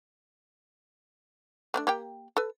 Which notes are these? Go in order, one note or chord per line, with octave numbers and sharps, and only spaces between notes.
A3 C#4 D4
A#3 G4 G5
A4 B4